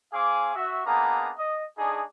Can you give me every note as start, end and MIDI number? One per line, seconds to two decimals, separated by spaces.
0.13 0.52 60
0.13 0.52 68
0.13 0.52 77
0.13 0.52 80
0.13 0.52 86
0.55 0.85 66
0.55 0.85 76
0.85 1.32 58
0.85 1.32 59
0.85 1.32 62
0.85 1.32 63
0.85 1.32 68
0.85 1.32 82
1.38 1.64 75
1.78 2.03 57
1.78 2.03 62
1.78 2.03 63
1.78 2.03 68